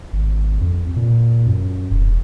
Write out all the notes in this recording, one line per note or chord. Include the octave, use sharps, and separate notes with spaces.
G#1
F2
A#2
F#2
E1